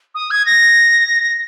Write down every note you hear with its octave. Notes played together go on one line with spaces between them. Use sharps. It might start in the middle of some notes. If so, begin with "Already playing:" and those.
D#6
G#6
A#6